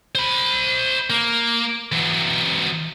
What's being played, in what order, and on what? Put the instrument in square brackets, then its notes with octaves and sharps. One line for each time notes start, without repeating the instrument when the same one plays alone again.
[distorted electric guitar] C5 B5
A#3
E3 F#3